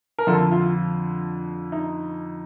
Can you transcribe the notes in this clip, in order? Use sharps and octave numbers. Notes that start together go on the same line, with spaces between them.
A#4
F2 D3 F3 F4 A4
F4
D#4